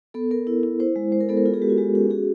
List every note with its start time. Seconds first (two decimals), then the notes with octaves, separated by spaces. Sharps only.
0.14 B3 A4
0.31 B3 A#4
0.47 E4
0.63 E4
0.80 E4 C5
0.96 G#3
1.12 G#3 C5
1.21 A#4
1.29 B3 A4
1.37 A#4
1.46 F4 A4
1.54 G#4
1.62 G#3 G4
1.69 F#4
1.78 G#3 G4
1.94 C#4 G4
2.10 F#4 G#4